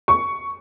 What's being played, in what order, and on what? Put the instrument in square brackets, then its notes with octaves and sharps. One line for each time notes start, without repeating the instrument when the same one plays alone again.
[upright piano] C#6